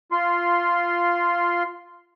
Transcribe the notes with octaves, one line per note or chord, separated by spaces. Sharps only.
F4 C6